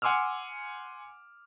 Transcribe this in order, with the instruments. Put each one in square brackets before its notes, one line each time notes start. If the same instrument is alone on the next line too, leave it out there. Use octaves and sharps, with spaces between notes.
[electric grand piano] F#5 G#5 C6 D6 E6 F6